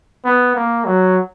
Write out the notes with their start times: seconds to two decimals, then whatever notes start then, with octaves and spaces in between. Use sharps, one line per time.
0.25 B3
0.55 A#3
0.85 F#3